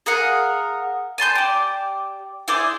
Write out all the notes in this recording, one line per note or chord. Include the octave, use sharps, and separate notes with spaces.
G#4 A#4 F5 F#5
G#5 A5 C6 G6
G4 D5
E4 G#4 C5 D5